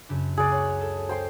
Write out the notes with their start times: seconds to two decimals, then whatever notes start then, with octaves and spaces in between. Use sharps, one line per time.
0.09 F#2 C#3 D4
0.37 C#2 G#4 D5 F#6 C#7
0.52 C#5 F#5
0.81 A4
1.09 C5 G5 C6